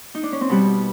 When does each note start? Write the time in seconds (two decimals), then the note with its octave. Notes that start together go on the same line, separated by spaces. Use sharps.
0.15 D#4
0.23 D4
0.32 C#4
0.41 C4
0.49 B2 G3 B3